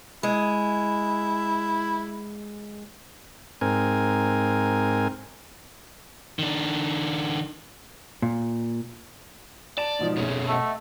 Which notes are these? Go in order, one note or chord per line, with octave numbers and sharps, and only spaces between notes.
G#3 E4
G#2 C4 A#4 G#5
D#3 D4
A#2
D5 A5 E7
G#2 B2 F3
F1 D2 B2 C#4 G#4
A3 D#5 E5 F#5